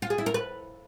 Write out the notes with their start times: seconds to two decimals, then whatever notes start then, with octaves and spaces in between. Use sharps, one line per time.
0.02 F4
0.10 G#4
0.18 E4
0.26 A#4
0.34 B4